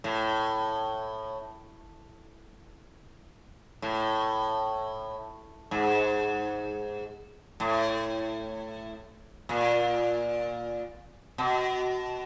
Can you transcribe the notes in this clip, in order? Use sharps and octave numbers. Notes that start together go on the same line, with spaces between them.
A2
A2
G#2
A2
A#2
B2